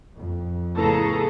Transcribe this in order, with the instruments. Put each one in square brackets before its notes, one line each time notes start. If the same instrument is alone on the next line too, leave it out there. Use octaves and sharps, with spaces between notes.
[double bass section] F2
[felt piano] A2 B3 [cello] C#3 G#4 [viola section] A4 A5 A#5